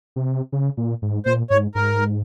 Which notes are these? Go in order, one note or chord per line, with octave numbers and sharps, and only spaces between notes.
C3
C#3
A#2
G#2
A#2 C5
G#2 C#5
G#2 A#4